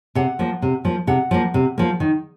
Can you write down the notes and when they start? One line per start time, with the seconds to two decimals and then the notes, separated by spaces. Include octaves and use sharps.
0.15 C3 F#5
0.39 F3 A#3
0.62 C3
0.85 F3 A#3
1.07 C3 F#5
1.31 F3 A#3
1.54 C3
1.78 F3 A#3
2.00 D#3